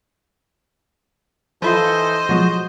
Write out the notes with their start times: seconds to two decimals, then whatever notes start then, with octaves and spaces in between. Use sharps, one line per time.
1.62 E3 F3 E4 F4 A4 C5 D#5
2.29 B2 F3 F#3 G#3 F#4